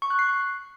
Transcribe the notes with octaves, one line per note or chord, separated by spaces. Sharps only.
C#6
F#6
C7